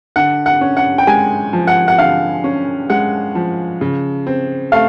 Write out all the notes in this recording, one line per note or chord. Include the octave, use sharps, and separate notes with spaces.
D3 F#5
F#5
C#4
F#5
G5
G#3 G#5
F3
F#5
F#5
D3 F5
C#4
G#3 F#5
F3
C#3
C4
A3 F5